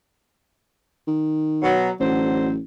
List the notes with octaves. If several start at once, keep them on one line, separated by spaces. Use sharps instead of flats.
D#3
B2 F#3
A1 D3 F#3 C5